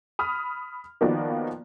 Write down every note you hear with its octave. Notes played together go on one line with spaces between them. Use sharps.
B5 D#6 F6
D#3 F3 A#3 B3 F#4 D5